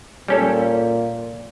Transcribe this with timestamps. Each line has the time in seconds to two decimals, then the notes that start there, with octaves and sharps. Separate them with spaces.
0.28 A#2 G3 C#4 A4